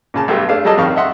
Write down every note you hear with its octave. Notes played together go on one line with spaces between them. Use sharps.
A#2 C#3 A5
B1 G2 A3 G4
A3 D4 F5
F#3 G3 G#4 A4 D#5 A5
F2 A2 D#3 F5 C#6
D#5 E5 F#5 C6